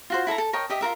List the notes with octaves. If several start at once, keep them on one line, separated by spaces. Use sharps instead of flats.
F4 F#4 C5
E4 A4 F5 A#5
A4
A#4 C#5 D#5 G5
G4 D#5 E5
F4 F#4 A#4 E5